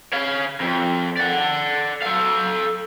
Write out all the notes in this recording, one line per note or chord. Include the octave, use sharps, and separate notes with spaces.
C#5 F5
F2
D5 F#5
A4 F5